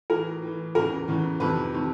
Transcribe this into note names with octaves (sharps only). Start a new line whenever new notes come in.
A2 E3 A#4
A2 E3
E2 C#3 E3 A#4
E2 C#3 E3
F2 C3 D#3 B4
C3 D#3